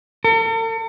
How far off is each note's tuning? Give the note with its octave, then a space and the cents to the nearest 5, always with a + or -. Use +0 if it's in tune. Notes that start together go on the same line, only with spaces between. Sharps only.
A4 +45